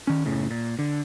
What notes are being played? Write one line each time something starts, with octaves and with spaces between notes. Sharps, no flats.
D#3 C#4
F#1 A2 C#3
A#2
D3